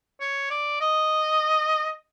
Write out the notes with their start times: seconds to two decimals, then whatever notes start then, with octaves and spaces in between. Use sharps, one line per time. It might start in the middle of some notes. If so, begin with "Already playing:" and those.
0.20 C#5
0.51 D5
0.81 D#5